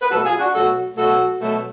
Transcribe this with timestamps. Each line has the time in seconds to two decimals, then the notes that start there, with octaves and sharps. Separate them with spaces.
0.01 B4
0.10 B2 F#3 A3 F#4 A4
0.24 F4 G#4
0.39 D4 F#4
0.54 B2 F#3 A3 F#4 A4
0.96 B2 F#3 A3 F#4 A4
1.40 B2 F#3 A3